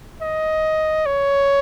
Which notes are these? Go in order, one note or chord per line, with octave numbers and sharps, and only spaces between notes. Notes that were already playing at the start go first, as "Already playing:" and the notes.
D#5
C#5